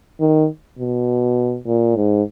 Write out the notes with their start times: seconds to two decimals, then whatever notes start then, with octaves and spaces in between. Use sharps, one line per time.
0.20 D#3
0.79 B2
1.66 A#2
1.96 G#2